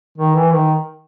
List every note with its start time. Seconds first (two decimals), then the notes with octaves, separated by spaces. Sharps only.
0.18 D#3
0.36 E3
0.53 D#3